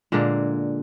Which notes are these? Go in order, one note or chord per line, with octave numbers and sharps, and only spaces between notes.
A#2 D3 G#3 A#3